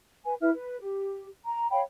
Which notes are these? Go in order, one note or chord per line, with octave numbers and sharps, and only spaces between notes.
B4 G#5
E4 B4 E5 F6
B4
G4
A#5
C#5 F5 G5 B5